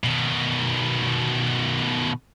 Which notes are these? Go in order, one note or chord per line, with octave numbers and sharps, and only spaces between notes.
B2 D#3